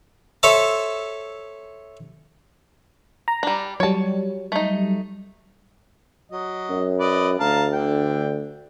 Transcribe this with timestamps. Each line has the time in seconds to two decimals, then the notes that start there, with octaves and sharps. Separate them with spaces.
0.43 A4 C5 C#5 E5 A5
3.28 A#5
3.43 G3 D4
3.80 F#3 G3 C#5 A5
4.52 A3 D#4
6.32 F#3 D#5
6.70 F#2
7.00 B4 D5 D#5
7.40 D2 F5 A5 A#5
7.73 D3 G5